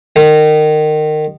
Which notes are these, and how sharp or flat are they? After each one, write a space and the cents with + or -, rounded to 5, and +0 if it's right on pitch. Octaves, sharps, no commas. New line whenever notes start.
D#3 -25